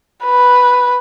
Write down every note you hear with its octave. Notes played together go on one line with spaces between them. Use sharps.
B4